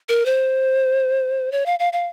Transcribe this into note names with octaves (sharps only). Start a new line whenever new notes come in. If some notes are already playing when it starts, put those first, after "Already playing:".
A#4
C5
C#5
F5
F5
F5